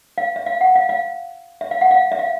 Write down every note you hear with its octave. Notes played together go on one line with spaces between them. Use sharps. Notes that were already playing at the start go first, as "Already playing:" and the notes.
F5
E5
F5
F#5
F5
F5
E5
F5
F#5
F5
E5
F5